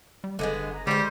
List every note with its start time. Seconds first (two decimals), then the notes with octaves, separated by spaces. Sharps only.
0.24 G3
0.39 F#1 D3 G#3 B3
0.72 A#5
0.87 D3 G3 G#3 C5 C#5